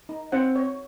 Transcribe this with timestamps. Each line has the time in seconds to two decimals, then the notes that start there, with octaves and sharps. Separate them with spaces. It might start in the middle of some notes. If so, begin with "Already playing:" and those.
0.09 D#4
0.32 C4 F#5
0.56 C#5